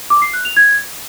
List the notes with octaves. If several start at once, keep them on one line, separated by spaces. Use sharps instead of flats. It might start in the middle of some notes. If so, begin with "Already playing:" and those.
D6
C7
F#6
F7
G#6